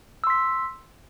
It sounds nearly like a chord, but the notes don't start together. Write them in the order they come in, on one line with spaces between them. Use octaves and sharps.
E6 C6 B6